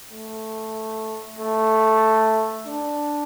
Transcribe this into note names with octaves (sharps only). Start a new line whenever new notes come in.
A3
A3
D4